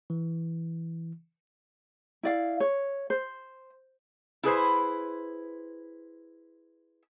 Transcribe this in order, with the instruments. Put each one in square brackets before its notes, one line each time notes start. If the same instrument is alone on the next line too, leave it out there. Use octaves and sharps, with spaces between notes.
[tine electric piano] E3
[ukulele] E4 D5 F5
C#5
C5
[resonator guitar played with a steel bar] E4 G#4 B4 C5